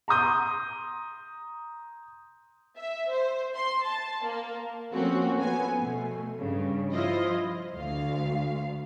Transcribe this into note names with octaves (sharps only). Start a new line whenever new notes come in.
A#5 C6 D#6 G6
E5
C5
C6
A5
A#3
F3 A3 A#3 C4 C#4 F#4
F3 B3 G#5
B2 A3
G2 C#3
F3 E4 F4 C5 D#5
D2 F5